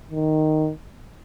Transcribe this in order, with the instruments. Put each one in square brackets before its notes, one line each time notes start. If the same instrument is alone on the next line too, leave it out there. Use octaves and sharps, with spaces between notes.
[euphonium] D#3